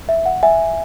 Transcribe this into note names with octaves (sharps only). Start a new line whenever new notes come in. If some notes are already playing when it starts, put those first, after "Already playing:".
E5
F#5
E5 G#5